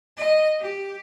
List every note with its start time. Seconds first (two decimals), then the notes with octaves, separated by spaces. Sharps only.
0.17 D#5
0.60 G4